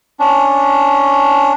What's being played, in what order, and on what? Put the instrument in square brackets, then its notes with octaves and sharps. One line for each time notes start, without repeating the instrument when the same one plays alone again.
[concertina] C#4 D4